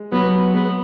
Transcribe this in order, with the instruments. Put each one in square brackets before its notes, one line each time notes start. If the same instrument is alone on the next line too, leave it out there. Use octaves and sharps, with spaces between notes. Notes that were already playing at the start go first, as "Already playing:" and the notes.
Already playing: [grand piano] G#3
[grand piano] F#3 [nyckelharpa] B3
[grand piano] G#3 [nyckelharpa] B3